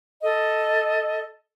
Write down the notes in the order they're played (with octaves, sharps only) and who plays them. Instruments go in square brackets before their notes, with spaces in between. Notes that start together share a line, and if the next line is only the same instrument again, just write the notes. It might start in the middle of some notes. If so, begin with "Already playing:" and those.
[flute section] A4 D#5